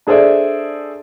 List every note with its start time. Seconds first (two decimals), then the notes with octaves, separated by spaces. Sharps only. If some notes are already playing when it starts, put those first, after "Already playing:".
0.07 D4 G#4 A4 C5 D5 E5